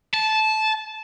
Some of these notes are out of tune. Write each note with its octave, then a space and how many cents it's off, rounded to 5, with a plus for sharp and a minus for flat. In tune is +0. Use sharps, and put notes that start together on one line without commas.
A5 -15